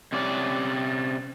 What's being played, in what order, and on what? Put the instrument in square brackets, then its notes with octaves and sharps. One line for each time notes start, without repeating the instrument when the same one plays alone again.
[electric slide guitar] C3 C#4 D5